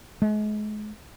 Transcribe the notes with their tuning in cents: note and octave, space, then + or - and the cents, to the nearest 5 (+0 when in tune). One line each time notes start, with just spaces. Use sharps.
G#3 +35